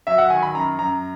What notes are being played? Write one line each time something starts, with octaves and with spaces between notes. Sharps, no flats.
F#3 E5
F#5
D#3 G#5
B5
F#2 A#5
F#2 A#5